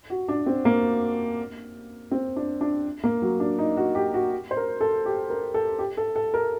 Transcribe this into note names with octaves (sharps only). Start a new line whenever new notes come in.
F#4
D4
C4
A#3
C4
D4
D4
A#3
F#3
D4
D#4
F#4
G4
F#4
C5
A#4
A4
G4
A#4
A4
G4
A4
A4
A#4